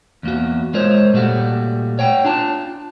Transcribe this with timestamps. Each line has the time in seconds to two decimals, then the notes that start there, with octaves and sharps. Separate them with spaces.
0.23 E2 A#3 F#4
0.74 G#3 F4 A#4 C5 C#5
1.14 A#2 G3 A3 F#4
1.99 C#5 F#5 G5
2.25 D4 F4 A5